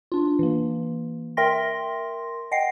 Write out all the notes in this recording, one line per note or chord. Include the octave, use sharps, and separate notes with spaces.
D4 F4
E3 A#3
A#4 E5 G5 C6 A#6
D#5 F#5 G5 C7